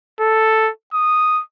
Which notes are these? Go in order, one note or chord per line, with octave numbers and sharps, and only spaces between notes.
A4
D#6